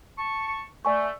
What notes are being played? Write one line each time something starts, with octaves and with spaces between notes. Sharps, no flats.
A5 C#6
A3 D5 G#5 C#6